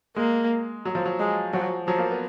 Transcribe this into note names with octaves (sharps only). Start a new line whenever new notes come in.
G#3 A#3
F#3
F3
F#3
G#3
F3 F#3
F3 F#3
A#3
B3